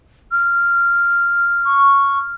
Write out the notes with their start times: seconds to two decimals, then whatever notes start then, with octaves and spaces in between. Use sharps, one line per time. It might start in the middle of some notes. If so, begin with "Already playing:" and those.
0.31 F6
1.65 C#6